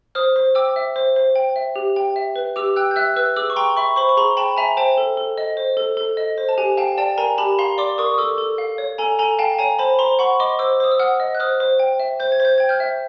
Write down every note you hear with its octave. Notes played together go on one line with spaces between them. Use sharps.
C5 D#6 F6
C5
G5 D6 E6
E5
C5
C5
G5
E5
G4
G5
E5
B4
G4 D6 E6
G5 E6 F#6
G6
E5 E6 F#6
B4 E6 F#6
G#4 D6 E6
C#6
G5 A#5 C6
E5 B5 C#6
C5 B5 C#6
C#6
G#4 A#5 C6
G5 A5 B5
E5 G#5 A#5
C5 G5 A5
A4
A4
D#5
C5
A4
A4
D#5
C5
A5
G4 G#5
F5 G5 A5
D5 G5 A5
A#4 G#5 A#5
G4 A5 B5
F5 A#5 C6
D5 C6 D6
A#4 C#6 D#6
D#6
A4 D6 E6
A4
F5
C#5
A4 G#5 A#5
A4 G#5 A#5
F5 G5 A5
C#5 G#5 A#5
C5 A5 B5
C5 A#5 C6
F#5 B5 C#6
D#5 C6 D6
C5 D6 E6
C5 D#6
E6
F#5 D#6 F6
D#5
F#6
C5 D#6 F6
C5
G5
E5
C5 G6
G#6
C5
G6
G5 G#6
F6 G6
E5